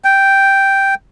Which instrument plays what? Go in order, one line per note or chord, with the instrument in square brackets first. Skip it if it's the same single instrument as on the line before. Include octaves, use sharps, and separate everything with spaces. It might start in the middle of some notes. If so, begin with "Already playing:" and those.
[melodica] G5